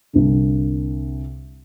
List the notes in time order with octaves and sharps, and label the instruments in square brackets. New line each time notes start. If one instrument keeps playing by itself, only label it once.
[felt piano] C2 D3